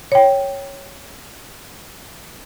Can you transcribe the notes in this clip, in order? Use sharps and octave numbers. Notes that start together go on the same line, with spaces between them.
C#5 G5